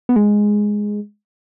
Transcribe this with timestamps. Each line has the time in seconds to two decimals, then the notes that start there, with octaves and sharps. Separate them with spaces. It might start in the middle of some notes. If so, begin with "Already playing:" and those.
0.09 B3
0.16 G#3